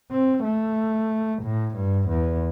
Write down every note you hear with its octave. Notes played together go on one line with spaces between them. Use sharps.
C4
A3
A2
G2
E2